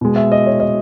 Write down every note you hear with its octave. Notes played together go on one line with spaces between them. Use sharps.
B2 G#3
E5
D#5
C#5
D#5